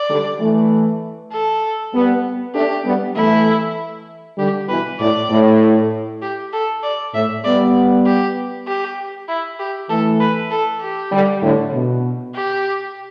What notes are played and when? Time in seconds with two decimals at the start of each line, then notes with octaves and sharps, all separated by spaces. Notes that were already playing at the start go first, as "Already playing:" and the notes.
Already playing: D5
0.10 D3 G3
0.41 E3 A3
1.32 A4
1.94 G3 B3
2.55 A3 D4 G4
2.85 G3 B3
3.16 E3 A3 E4
4.38 D3 G3 G4
4.69 B2 E3 B4
5.00 A2 D5
5.30 A2
6.22 G4
6.53 A4
6.83 D5
7.14 A2 E5
7.45 G3 B3 D5
8.06 G4
8.67 G4
9.28 E4
9.59 G4
9.90 E3 A3 A4
10.20 B4
10.51 A4
10.81 G4
11.12 D3 G3
11.43 A2 D3
11.73 B2
12.35 G4